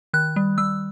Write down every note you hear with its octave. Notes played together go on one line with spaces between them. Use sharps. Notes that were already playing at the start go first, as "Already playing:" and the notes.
D#3 F#6
G3
G3 E6